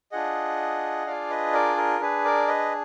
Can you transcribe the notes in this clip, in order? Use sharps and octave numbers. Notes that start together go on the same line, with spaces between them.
D4 F4 G#4 D#5 F#5
D4 F4 G#4 D5 F5
B4 D#5
A#4 D5
A#4
D4 G#4 B4
A#4 D5
B4 D#5